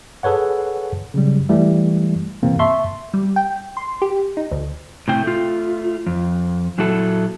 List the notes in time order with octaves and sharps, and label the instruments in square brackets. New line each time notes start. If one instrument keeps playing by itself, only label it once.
[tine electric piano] G#4 A4 B4 C#5 F#5
C#3 F#3 G3
E3 G3 A3
C3 E3 A#3 C4
E5 A5 C6 C#6
[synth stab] G3
G5
C6
G4
D#4
D2
[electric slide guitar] A2 C3 G5
A3 F4
F2
A#2 F#3 E4 F#4 A4